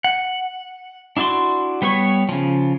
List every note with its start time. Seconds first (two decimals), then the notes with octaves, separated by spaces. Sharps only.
0.04 F#5
1.17 D4 E4 F#4 D5 C6
1.82 G3 B3 B4 C#5 C#6
2.29 C#3 F3